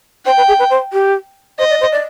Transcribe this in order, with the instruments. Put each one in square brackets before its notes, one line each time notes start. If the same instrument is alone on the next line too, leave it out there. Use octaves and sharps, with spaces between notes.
[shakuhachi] C5 [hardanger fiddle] G5
[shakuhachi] B4
G#4
B4
C5
G4
[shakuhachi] C5 [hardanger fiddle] D#5
[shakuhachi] D5
C5
D5